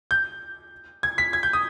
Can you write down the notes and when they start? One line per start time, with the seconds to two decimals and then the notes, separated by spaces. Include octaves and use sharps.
0.11 G6
1.03 G#6
1.18 B6
1.33 G#6
1.43 G6
1.53 D#6